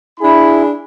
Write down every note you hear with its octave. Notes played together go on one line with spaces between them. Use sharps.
D4 E4 G#4 B5